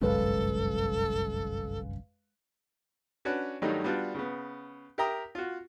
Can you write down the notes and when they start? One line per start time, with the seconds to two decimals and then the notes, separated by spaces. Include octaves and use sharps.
0.02 G1 C2 F#2 G#3 A4 B4 F5
3.25 C#4 D4 F#4 B4
3.62 G2 D#3 F#3 G3 A3 D#4
3.84 G3 B3 D4 F4 F#4
4.15 C#3 B3
4.98 G4 A#4 E5 G5 A#5 D#6
5.35 F4 F#4